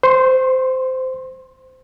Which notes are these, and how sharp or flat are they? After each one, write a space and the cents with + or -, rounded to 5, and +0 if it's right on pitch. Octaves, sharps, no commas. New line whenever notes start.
C5 -15 C6 +40